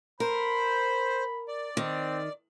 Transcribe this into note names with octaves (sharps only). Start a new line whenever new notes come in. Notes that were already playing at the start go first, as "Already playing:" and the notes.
A#4 C5 B5
D5
D#3 C4